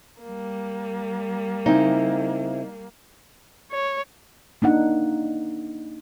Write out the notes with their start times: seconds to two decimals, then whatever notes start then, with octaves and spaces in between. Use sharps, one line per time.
0.23 G3 A#3
1.66 C#3 C4 D#4 E4
3.72 C#5
4.62 A#3 D4 D#4 F#5